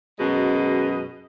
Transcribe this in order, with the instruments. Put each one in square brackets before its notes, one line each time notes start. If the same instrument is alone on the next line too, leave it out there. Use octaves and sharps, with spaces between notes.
[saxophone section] F#2 B2 G#3 D#5